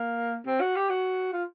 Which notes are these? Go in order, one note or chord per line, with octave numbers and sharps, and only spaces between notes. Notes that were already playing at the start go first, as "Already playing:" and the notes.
Already playing: A#3
C4
F#4
G4
F#4
F4